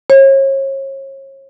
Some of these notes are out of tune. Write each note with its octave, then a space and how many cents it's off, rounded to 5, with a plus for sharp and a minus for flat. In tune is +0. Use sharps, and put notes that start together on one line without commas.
C#5 -35